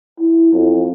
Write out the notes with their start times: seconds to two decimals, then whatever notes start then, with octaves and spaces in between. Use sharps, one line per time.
0.19 E4
0.53 F2